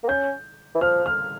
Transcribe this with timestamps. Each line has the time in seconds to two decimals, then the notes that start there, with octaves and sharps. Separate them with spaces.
0.03 A#3
0.08 C#4 G6
0.75 E3
0.81 F3 F6
1.06 F6